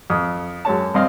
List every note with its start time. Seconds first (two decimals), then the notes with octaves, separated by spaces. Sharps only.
0.10 F2 D#6
0.65 F#2 G#3 C#5 A5
0.94 G2 C4 D#5 F5